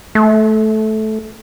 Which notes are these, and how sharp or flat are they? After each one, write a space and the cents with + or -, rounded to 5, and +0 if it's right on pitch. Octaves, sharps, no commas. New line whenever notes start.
A3 -15